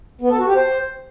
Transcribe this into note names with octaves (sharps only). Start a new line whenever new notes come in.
B3
A4
F#4
G4
C5